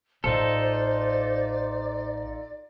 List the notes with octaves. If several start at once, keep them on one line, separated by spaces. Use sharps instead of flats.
A1 D#4 F4 A4 C5 D5